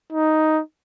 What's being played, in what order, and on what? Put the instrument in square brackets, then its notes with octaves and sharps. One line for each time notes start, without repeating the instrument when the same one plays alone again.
[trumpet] D#4